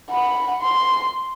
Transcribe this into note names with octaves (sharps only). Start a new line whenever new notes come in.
F#5 B5
C6